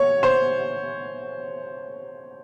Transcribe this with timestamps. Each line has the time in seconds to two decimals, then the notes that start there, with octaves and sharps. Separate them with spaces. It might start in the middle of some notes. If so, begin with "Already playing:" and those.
Already playing: C#5
0.23 C5